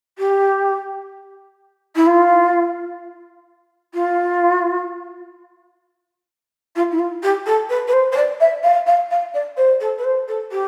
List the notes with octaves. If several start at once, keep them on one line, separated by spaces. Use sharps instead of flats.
G4
E4
F4
F4
F4
E4
F4
G4
A4
B4
B4
C5
C5
D5
E5
F5
F5
F5
D5
C5
A4
B4
C5
A4
G4